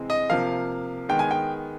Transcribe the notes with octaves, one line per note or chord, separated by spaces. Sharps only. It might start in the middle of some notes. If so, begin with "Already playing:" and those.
Already playing: C3 E3 G#3 C4
D#5
C3 F3 A#3 F5
D#3 G#3 B3 G5
G#5
G5